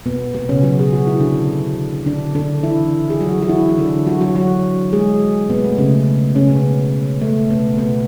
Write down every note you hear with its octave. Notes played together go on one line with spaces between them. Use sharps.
B2 B3
B2 B3
C#3 C#4
F#3 F#4
G#4
F#4
E4
D3 D4
D3 D4
D3 D4
E3 E4
G#4
F#3 F#4
F#4
E3 E4
E4
D3 D4
F#3 F#4
F#3 F#4
F#3 F#4
G#3 G#4
B2 B3
A3
C#3 C#4
C#3 C#4
B2 B3
A3
B2 B3
B2 B3